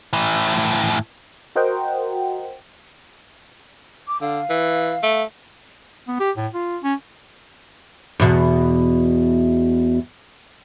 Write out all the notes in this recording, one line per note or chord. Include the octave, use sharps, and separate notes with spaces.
A2 E3
F#4 A#4 C5 D#5 F#5 G5
D6
D3 F5
E3
A3
B3
G4
A2
F4
C#4
E2 B2